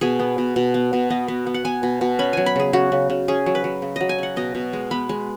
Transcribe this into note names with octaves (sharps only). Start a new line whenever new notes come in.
B2 G#4
B3
B2
B2
B3
B2
B3 D#5
B3
B3
F#5
B3 G#5
B2
B2
C#4 B5
F#3 G#5
B5
C#3 G#4
C#3 F#4
C#3
C#3
C#4 G#4
F#3
B4
F#3
C#3
F#3 D#5
G#5
C#3 F#5
B2 D#5
B2
G#3
B3 B5
G#3